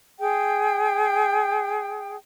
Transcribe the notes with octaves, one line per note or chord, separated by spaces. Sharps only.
G#4 G5